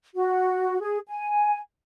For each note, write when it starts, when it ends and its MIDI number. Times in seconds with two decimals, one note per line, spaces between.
0.15 0.77 66
0.81 0.98 68
1.07 1.58 80